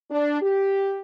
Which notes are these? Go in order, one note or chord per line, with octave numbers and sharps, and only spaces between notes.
D4
G4